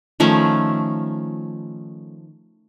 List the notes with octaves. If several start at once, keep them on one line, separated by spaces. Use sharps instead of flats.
D#3 F3 A3 C#4